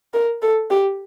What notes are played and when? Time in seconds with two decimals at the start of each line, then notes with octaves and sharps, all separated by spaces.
0.13 A#4
0.42 A4
0.70 G4